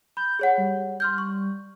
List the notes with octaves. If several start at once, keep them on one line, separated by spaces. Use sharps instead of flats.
B5 G6
G#4 C#5 F#5
G3
C6 F6 G6
C#6